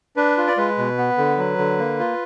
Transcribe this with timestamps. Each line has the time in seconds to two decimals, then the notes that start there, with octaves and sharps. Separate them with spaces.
0.17 D4 B4
0.38 F4
0.47 D5
0.57 G#3 B4
0.78 B2
0.98 B3
1.18 D3
1.38 F#3
1.58 D3
1.78 A#3
1.99 F4